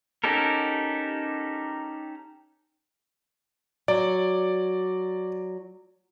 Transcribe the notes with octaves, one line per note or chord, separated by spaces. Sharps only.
C#4 D#4 G4 A4 A#4
F#3 D5